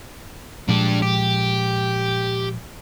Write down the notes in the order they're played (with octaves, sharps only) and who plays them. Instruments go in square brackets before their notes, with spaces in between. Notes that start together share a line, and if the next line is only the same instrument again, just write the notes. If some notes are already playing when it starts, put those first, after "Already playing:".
[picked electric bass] A#2 F3 G#3 [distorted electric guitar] D4 G4
[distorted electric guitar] G4